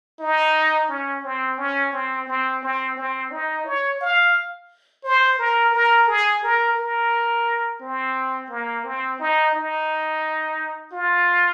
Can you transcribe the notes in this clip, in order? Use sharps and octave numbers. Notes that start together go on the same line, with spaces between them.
D#4
C#4
C4
C#4
C4
C4
C4
C4
D#4
C#5
F5
C5
A#4
A#4
G#4
A#4
A#4
C4
A#3
C4
D#4
D#4
F4